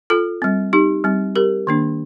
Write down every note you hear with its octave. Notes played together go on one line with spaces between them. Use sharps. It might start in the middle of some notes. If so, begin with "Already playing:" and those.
F4 A4
G3 C4
D#4 G4
G3 C4
G4 A#4
D#3 A#3 D4